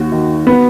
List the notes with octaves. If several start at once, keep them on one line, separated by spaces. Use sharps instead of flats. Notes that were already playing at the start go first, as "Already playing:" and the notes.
Already playing: D#2 F#4
D#3
B3